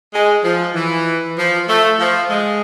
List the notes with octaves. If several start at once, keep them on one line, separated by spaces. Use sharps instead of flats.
G#3
F3
E3
F3
A3
F3
G#3